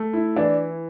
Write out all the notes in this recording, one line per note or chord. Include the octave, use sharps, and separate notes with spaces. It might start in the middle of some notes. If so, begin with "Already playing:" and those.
Already playing: A3
E4
E3 D4